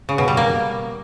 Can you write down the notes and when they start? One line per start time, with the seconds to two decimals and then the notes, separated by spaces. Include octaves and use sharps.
0.09 C#3
0.18 B2
0.28 G3
0.37 A#3